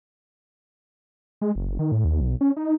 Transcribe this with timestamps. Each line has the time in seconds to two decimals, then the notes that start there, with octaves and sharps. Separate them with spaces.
1.41 G#3
1.56 F#1
1.79 D#3
1.92 A2
2.05 D#2
2.21 B1
2.41 C#4
2.57 D#4